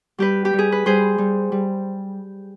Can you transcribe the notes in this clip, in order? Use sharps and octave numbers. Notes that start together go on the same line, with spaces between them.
G3 G4 B4
G4
G3
G#4
B4
G3 G#4 C5
G3
G3